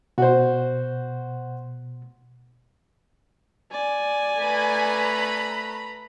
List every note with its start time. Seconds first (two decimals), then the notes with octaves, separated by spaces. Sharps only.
0.18 B2 F#4 C5
3.73 D5 G#5
4.40 A3 B4 A#5 B5